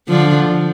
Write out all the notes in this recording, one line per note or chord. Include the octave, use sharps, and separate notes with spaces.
D3 F3